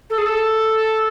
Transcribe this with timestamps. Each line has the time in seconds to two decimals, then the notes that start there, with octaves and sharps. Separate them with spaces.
0.10 A4
0.18 G#4
0.25 A4